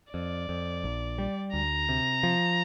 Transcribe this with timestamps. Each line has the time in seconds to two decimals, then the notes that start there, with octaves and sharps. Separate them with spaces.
0.13 F2 D5
0.49 F2
0.84 A#1
1.18 G3
1.53 D2 A#5
1.89 C3
2.23 F3